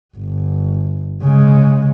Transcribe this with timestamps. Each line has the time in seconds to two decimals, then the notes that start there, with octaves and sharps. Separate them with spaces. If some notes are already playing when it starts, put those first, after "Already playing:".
0.16 G1
1.22 C#3 G#3